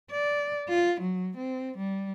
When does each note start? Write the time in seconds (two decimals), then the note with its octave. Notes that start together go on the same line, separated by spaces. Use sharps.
0.11 D5
0.69 F4
1.01 F#3
1.37 C4
1.78 G3